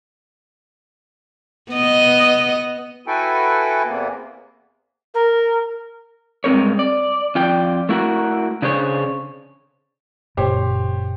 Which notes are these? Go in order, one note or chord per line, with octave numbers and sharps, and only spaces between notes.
B3 D#5
E4 F#4 A4 B4 G5 G#5
E2 C3 E3 A#3 B3
A#4
G2 G#3 C4 A#4 C#5
D5
F2 F4 D5 G5
A3 E4 F#4 A#4
C#3 D4 G#4 C5 C#5
F#1 A#2 G4 C5 C#5